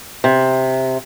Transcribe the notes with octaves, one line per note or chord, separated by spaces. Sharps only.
C3